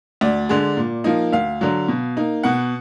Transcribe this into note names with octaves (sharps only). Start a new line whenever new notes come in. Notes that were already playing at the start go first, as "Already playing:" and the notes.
D2 D5
D3 G#3
A#2
F3 A#3 D#4
D2 F5
D3 F#3
B2
A#3 D#4
B2 F#5